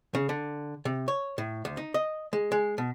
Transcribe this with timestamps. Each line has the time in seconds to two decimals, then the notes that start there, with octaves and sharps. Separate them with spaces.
0.15 C#3
0.29 D3
0.85 C3
1.08 C#5
1.38 A2
1.65 D2
1.77 D#4
1.94 D#5
2.33 G#3
2.52 G#3
2.78 B2